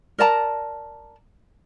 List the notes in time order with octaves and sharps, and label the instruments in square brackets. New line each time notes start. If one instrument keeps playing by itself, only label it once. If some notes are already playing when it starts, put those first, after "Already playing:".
[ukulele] A#4 D5 A5 A#5